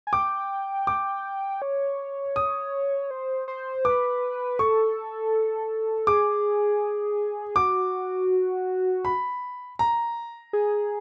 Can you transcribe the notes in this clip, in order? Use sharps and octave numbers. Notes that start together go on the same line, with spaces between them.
G#5
G5 D6
D6
C#5
D#6
C5
C5
B4 D6
A4 C#6
G#4 D6
F#4 D6
B5
A#5
G#4